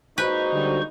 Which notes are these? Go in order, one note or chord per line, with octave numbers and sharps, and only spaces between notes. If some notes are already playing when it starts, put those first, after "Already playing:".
A#2 G#3 D#4 F#4 B4 C5 C#6
D3 F#3 G3